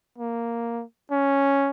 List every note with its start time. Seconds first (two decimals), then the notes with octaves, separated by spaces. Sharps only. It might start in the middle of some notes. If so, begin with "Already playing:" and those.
0.18 A#3
1.11 C#4